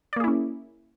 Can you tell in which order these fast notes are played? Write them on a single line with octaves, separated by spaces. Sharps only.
D5 A#3 G#4 E4 C#4